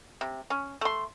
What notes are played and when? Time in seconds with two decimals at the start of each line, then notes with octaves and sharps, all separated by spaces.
0.21 C3
0.50 C#4
0.81 A3 C6